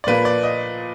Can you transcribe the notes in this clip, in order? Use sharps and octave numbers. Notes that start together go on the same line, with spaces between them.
D5
A#2 F3 A#3 B4
D5
D#5